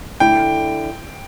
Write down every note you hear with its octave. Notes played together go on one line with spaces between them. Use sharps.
D3 A3 E4 G5